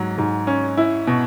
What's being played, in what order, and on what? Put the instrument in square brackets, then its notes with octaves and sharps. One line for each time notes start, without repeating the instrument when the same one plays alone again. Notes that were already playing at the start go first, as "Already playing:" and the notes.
Already playing: [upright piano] G#2 F#3
G#2
C#4
E4
B2